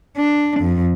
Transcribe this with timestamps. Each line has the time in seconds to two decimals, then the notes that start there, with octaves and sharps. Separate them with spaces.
0.17 D4
0.61 F2